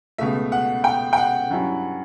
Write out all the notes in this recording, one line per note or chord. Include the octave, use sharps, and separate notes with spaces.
C#2 B2 A3 E5
F#5
G5
G5
F#5
G2 F#3 C#4 E4